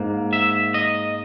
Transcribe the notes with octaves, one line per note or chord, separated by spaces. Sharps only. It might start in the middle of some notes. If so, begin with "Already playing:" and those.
Already playing: G#2 A#3
E5
D#5